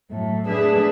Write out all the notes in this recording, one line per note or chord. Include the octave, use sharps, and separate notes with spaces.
A2 F#3 A3
A3 D4 G#4 B4 E5